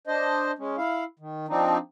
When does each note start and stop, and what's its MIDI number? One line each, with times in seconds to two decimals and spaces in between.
0.07 0.51 62
0.07 0.51 72
0.07 0.51 75
0.59 0.76 56
0.59 0.76 61
0.78 1.04 64
0.78 1.04 77
1.19 1.46 51
1.48 1.78 53
1.48 1.78 60
1.48 1.78 62
1.48 1.78 63